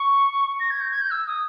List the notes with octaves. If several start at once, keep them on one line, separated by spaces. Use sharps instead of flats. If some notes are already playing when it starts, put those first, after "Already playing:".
Already playing: C#6
A#6
G#6
G6
G#6
G6
E6
D#6